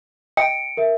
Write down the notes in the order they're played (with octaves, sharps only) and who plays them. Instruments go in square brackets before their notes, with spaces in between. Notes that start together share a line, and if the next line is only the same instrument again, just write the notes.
[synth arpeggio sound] D#5 G5 [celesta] C#7 D7
[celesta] A#4 E5